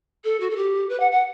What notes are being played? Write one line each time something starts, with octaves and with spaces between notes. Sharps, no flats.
A4
F#4
A4
G4
B4
F#5
F#5